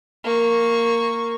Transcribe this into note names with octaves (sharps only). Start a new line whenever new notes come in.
A#3 C#6